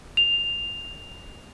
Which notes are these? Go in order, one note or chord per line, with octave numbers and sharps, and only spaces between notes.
F7